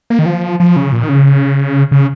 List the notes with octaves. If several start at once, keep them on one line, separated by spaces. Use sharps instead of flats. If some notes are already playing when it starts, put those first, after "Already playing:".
A#3
D#3
F3
F3
C#3
A#2
D#3
C#3
C#3